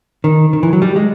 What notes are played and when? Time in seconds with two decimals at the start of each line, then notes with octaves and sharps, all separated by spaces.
0.24 D#3
0.53 D#3
0.63 E3
0.73 F#3
0.82 G3
0.96 G#3